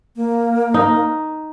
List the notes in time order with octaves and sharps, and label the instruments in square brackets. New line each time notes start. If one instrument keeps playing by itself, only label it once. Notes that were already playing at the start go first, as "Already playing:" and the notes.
[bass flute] A#3
[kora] D#4